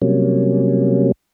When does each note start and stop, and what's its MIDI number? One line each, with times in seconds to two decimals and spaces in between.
0.02 1.12 48
0.02 1.12 54
0.02 1.12 55
0.02 1.12 58
0.02 1.12 61